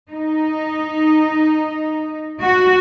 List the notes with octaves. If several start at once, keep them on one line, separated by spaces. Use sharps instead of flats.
D#4
F#4